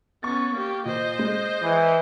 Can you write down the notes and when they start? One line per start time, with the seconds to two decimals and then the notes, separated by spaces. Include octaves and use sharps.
0.23 B3 C#4 C#6 A6
0.53 A#3 G4
0.86 A#2 C5 D#5
1.19 G#3
1.62 E3